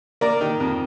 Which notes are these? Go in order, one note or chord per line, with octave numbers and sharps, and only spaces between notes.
A#3 A#4 D5
D#3
F2